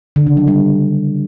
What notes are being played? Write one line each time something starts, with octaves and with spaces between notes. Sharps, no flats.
D3
C#3
F#3
G3